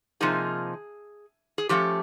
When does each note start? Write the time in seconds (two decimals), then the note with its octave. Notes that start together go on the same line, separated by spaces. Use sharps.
0.21 C3 F3 A#3 D#4 G#4
1.58 G#4
1.69 F3 A3 C#4 G4